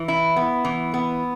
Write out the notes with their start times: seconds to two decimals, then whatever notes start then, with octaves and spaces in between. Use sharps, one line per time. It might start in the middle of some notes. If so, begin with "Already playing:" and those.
Already playing: E3
0.08 E4
0.36 B3
0.65 E3
0.94 B3